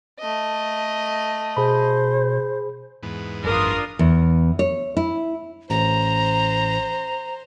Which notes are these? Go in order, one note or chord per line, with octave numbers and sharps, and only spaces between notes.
A3 D#5
B2 G#4 C5 B5
E2 G#2 B3
G#1 F#2 F#3 D4 F4 A#4 D#6
E2
C#5
E4
A1 C5 A#5